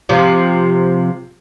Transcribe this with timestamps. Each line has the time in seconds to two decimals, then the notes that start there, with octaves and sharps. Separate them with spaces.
0.09 C3 F3